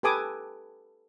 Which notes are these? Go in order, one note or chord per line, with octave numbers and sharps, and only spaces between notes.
G4 A4 B4 G#5 D6 D#6